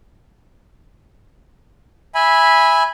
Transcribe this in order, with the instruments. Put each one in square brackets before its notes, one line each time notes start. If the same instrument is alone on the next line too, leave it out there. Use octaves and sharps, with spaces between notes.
[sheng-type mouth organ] E5 G#5 B5